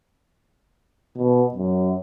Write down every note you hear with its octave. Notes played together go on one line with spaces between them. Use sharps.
B2
F#2